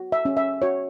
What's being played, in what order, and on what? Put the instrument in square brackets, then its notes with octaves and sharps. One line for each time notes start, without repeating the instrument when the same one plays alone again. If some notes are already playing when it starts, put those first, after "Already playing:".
Already playing: [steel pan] F#4
E5
C#4
E5
F#4 C#5